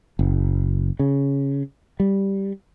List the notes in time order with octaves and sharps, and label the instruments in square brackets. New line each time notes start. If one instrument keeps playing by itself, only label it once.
[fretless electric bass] F#1
C#3
G3